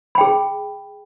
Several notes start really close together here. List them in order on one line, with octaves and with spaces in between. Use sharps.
B5 G5 G#4